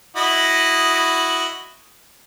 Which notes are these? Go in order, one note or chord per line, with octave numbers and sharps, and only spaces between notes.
E4 F#4 D#5